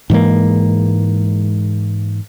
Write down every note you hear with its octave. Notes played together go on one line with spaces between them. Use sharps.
G#2 E3 G#3 A#3